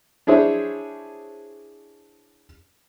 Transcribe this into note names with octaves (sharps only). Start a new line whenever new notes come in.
D4 E4 G#4 C5 C#5